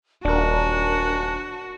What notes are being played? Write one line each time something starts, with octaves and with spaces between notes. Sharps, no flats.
D#1 D4 F#4 A#4 G#5 A5 F#6